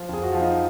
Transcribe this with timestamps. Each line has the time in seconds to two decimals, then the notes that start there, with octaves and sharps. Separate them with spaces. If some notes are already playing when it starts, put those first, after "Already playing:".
Already playing: F3 F4
0.09 F2 G#4
0.23 F#4
0.32 F3 F4
0.41 D#4